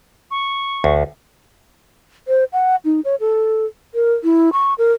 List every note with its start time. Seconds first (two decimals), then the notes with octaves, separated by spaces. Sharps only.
0.31 C#6
0.84 D2
2.28 C5
2.53 F#5
2.85 D#4
3.05 C#5
3.20 A4
3.94 A#4
4.24 E4
4.53 C#6
4.78 A#4